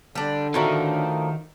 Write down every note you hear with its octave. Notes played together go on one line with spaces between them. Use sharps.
D3 G3 D4
A2 D#3 F3 A#3 D4 F#4 E5